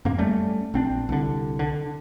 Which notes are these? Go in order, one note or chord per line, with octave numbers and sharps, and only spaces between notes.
F2 G#2 A#3
G3 A3 C#4
A#1 C4 D4
C2 D3
D3